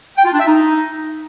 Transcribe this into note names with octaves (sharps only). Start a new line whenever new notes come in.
G5
F4
D4
E5
D#4